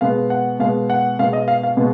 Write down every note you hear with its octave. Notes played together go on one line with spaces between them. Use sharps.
B2 G#3 B3 F5
F#5
B2 G#3 B3 F5
F#5
B2 G#3 B3 F5
D#5
F5
F5
B2 G#3 B3